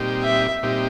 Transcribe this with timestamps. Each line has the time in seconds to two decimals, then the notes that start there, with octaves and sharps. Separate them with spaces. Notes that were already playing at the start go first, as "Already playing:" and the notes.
Already playing: A#2 G3 C4 D#4 G4
0.23 E5
0.63 A#2 G3 C4 D#4 G4